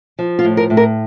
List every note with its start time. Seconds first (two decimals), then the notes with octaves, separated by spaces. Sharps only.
0.19 F3
0.39 F4
0.45 A2
0.57 A#4
0.70 A2
0.77 A#4